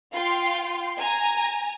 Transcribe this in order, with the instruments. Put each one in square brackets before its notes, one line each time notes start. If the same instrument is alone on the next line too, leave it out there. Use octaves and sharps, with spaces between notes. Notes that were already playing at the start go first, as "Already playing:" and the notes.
[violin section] F4 F5 G5 C6
G#5 A#5